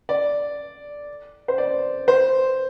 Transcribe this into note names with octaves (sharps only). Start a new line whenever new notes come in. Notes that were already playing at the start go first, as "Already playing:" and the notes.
D5
C5
D5
C5